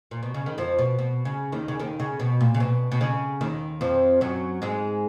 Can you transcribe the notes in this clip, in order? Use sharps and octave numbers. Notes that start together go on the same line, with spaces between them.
A#2
B2
C#3
D#3
F2 F3
B2
B2
C#3
D#2 D#3
C#3
D#2 D#3
C#3
B2
A#2
C#3
B2
B2
C#3
D#2 D#3
F2 F3
F#2 F#3
G#2 G#3